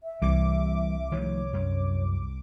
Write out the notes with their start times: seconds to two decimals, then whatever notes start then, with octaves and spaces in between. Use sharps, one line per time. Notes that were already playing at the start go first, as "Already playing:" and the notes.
0.03 E5
0.22 C2 E3 G3 D6
1.12 D#3 F3 A3 C#5
1.53 F#2